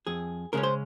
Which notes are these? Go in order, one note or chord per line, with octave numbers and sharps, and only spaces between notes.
F2 G#4
C#3 G#3 C#4 A#4
C5